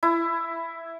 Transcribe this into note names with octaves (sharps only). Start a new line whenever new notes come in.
E4